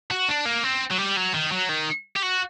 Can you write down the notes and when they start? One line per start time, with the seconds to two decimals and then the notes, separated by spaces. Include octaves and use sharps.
0.11 F#4
0.28 D4
0.46 A#3
0.64 C4
0.91 F#3
0.98 G3
1.17 F#3
1.34 D#3
1.52 F#3
1.69 D#3
2.16 G4
2.22 F#4